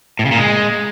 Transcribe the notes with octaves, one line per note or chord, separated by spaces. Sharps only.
A2
C#3
A#2
G#3